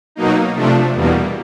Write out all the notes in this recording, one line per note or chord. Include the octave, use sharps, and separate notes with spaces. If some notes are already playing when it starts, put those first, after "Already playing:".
B2 F#3 A#3 D#4
C3 F3 A3 D4
E2 B2 G3 A#3